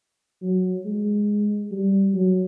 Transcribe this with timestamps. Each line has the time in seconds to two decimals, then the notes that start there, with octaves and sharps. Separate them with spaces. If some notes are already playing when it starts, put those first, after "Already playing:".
0.42 F#3
0.85 G#3
1.71 G3
2.14 F#3